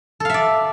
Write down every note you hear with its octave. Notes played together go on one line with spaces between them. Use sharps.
A4 D5 E5 F5